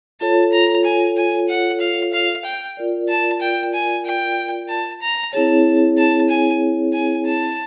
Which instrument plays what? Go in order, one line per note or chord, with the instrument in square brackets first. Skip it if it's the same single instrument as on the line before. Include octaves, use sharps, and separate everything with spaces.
[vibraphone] F4 A4 C#5 [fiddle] A5
[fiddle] A#5
G#5
G#5
F#5
F5
F5
G5
[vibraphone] F4 A#4 D5
[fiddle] A5
G5
G#5
G5
A5
A#5
[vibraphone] C4 E4 G#4 C#5 [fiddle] A5
[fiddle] A5
G#5
G#5
A5